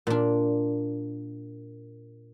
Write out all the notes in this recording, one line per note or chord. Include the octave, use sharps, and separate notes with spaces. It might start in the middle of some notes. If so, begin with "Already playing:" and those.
A#2 D4